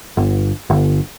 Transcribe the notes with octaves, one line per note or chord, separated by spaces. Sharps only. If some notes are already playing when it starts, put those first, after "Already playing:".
G1
G1